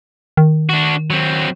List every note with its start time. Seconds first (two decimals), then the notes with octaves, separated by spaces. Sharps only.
0.37 D#3
0.69 D4 F#4
1.10 F#3 C4